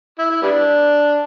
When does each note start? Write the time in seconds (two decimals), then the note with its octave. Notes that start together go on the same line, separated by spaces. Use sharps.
0.19 E4
0.30 E4
0.42 G3 B3 D4